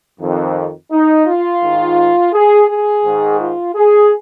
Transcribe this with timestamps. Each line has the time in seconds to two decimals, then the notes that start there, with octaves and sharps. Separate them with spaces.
0.21 F2 D#3
0.91 D#4
1.26 F4
1.62 G#2 D#3
2.33 G#4
2.68 G#4
3.03 G#2 D#3
3.40 F4
3.75 G#4